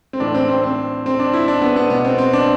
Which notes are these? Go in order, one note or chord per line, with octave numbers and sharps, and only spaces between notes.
C4
A2 E3 D4
C4
C4
C4
C4
D4
E4
D4
B3
B3
B2 B3
C4
C4
D4